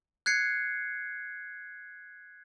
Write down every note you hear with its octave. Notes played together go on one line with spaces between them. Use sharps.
F#6 G#6 C7 C#7